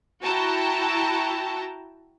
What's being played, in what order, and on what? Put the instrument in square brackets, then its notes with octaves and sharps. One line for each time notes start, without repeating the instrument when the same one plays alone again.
[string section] E4 F#4 G5 A5 A#5